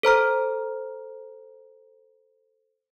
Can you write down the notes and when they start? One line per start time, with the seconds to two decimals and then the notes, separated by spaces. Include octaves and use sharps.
0.03 A4 C5 A#5 F6